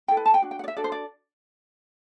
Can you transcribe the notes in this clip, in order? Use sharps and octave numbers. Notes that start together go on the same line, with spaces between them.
E4 A4 G5
B4
A5
G5
D4 F#4
G5
F#5
D5
E5
D4 F#4 A4 D5
C5
D5